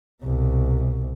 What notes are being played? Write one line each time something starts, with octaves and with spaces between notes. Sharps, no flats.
C2 B2